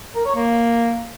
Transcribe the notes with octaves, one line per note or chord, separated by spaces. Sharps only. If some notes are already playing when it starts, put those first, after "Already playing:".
A#4
C#5
A#3